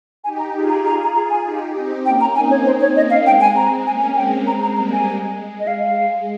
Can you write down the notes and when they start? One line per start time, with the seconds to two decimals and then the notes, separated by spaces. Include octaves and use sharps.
0.24 D#4 G4 G#5
0.39 A#5
0.54 F4 G#4
0.69 A#5
0.85 A#5
1.04 A#5
1.15 A#5
1.30 G#5
1.45 D#4 G4
1.75 C4 D#4
2.05 A#3 C#4 G5
2.21 A#5
2.35 C4 D#4 G#5
2.51 C#5
2.66 C5
2.81 C#5
2.96 A#3 C#4 D#5
3.10 F5
3.25 G#3 C4 G5
3.41 G#5
3.56 A#5
3.86 A#3 C#4 G#5
4.02 G#5
4.16 G#3 C4 G5
4.47 A#5
4.62 A#5
4.77 G3 A#3 A#5
4.92 G#5
5.07 G#3
5.60 D#5
5.67 F5
5.83 F5